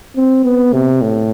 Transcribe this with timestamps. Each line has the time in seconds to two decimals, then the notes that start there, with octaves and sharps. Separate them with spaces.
0.16 C4
0.44 B3
0.73 C3
1.01 A2